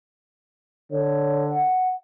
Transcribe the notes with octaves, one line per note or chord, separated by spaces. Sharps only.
D3 C#5
F#5